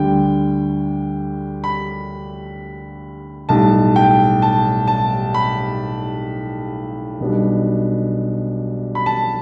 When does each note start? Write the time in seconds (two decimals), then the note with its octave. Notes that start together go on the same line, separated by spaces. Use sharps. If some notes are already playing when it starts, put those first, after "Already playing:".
Already playing: D2 D3 G3 G5
1.64 B5
3.49 B1 A2 G3 A5
3.96 G5
4.42 A5
4.88 A5
5.35 B5
7.20 B1 B2 G3 D4
8.95 B5
9.06 A5